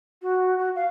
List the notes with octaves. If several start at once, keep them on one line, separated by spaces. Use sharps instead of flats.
F#4
F#4
F5